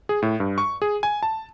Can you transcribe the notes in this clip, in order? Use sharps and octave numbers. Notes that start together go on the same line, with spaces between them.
G#4
A2
G2
C#6
G#4
G#5
A5